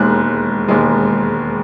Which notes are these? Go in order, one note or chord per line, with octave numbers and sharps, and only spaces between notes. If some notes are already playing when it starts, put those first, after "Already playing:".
Already playing: E1 D#2 D#3 G#3 F#6
E1 D#2 D#3 G#3